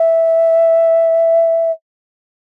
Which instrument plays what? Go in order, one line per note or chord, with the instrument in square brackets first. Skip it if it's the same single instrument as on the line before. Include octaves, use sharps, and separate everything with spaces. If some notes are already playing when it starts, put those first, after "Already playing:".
Already playing: [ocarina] E5